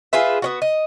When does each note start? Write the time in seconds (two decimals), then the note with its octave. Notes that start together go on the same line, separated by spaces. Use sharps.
0.13 F4 G#4 B4 E5
0.42 B3 C#4 F#4
0.62 D#5